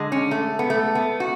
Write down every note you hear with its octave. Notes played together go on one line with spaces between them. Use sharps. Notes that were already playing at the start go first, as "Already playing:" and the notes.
Already playing: D3 G#3
C#4
A3
B3
A3
B3
F#4